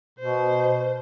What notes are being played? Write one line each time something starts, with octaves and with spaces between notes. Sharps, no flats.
B2 C5